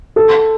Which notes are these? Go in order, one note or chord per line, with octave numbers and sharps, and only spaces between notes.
A4